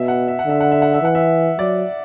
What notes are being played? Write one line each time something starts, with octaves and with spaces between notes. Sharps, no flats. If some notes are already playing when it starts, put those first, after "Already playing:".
Already playing: B2 E5
F#5
E5
F#5
D3 E5
F#5
E5
F#5
E5
E3 F#5
E5
F#3 D5